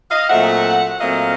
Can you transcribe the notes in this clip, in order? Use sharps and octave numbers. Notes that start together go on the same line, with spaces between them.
D#5 F5
A#2 F#3 A3 C4 E5 F#5
A#2 F#3 A3 C4 D#5 F5